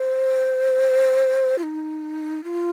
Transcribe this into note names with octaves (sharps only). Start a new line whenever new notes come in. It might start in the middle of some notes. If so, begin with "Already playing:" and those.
Already playing: C5
F4
D#4
F4